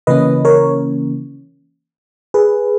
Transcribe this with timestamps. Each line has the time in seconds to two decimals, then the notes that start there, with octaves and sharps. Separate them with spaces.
0.07 C#3 E3 A#3 C#4 B4 D#5
0.45 A#4 C#5
2.34 G#4 B4